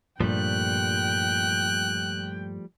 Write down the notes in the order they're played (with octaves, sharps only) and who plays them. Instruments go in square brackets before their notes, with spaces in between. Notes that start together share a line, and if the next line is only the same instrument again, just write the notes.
[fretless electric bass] G2 A#2 [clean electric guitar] F3 G3 A3 [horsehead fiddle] G5 [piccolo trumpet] F#6